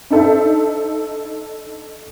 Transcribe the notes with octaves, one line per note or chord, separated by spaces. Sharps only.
D4 D#4 A4 C5 E5